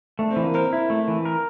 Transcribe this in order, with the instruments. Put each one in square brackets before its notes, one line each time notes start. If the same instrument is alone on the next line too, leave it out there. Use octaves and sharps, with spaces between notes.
[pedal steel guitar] A3 [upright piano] D4
[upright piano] C4
[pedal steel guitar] E3
[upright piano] A#3
[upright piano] C4 [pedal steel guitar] A#4
[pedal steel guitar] E4
A3
E3
A#4